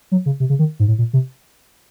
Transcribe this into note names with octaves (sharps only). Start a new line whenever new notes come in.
F#3
C#3
C3
C#3
D#3
G#2
A2
A#2
C3